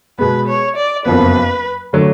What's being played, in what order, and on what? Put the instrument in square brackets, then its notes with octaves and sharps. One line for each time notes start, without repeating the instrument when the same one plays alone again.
[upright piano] B2 G#3 B3 [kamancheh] B4
[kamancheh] C#5
D5
[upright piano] F#1 F2 F3 B3 [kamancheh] B4
[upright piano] D3 F#3 A3